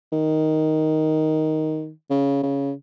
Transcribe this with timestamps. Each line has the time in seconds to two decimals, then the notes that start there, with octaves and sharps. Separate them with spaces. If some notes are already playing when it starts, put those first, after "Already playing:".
0.12 D#3
2.10 C#3
2.43 C#3